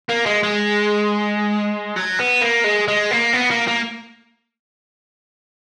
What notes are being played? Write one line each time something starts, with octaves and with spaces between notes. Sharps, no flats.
A#3
G#3
G#3
F#3
B3
A#3
G#3
G#3
A#3
B3
A#3
A#3